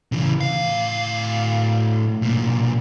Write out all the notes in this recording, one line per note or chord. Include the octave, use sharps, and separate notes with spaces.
C#3 E3
A2 F5
B1 A#2